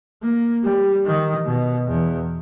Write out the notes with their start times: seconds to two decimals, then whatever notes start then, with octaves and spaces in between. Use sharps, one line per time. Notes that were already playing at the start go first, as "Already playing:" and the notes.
0.22 A#3
0.64 G3
1.05 D#3
1.45 B2
1.87 E2